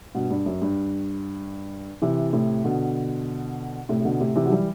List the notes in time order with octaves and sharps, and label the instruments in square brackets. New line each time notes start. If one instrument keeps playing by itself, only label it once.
[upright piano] G2 B2
G2
F#2
G2
C3 E3
A2 C3
B2 D3
A2 C3
C3
B2 D3
A2 C3
C3 E3
F#3
E3 G3